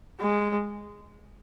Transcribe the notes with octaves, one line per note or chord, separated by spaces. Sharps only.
G#3